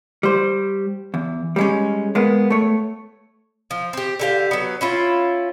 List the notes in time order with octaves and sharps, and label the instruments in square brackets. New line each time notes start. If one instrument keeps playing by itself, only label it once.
[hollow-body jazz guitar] G3 C5
E2
G3 G#3 C#4
G#3 A#3 B3
A3 C#5
[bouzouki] F3
C4 G4
D3 G4 F5
F#3 B3
C#4 E4 F4